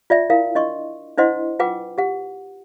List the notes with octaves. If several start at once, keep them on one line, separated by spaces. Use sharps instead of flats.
F4 D5 E5
E4 A#4 F5
D4 D#5 C6 C#6
D4 E4 C5 D#5 F#5 C6
F4 B4 F#5 G5 D6
G4 F#5